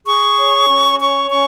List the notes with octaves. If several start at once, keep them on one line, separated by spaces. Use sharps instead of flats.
G#4 C#6
C#5
C#4
C#5 C#6
C#4 C#6